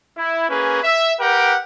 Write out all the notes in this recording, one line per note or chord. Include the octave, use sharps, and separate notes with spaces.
E4
A#3 C#4 G#4 B4
E5
G4 A#4 B4 F#5 G5